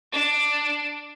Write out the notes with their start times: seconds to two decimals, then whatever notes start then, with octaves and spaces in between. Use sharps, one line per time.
0.12 D4